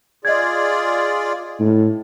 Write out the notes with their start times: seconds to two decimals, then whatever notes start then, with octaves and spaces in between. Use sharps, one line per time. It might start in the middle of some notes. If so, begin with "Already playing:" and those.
0.25 F4 G#4 D5 D#5 G#6
1.60 A2